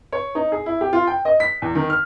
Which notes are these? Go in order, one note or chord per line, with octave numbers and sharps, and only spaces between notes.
C#5
D#4
G#4
E4
G4
F4
G5
D#5
B6
E2
D#3
F6